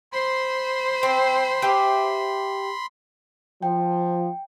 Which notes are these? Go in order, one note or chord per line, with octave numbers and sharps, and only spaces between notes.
C5 B5 C6
C4
G4 B4 E5
F3 G5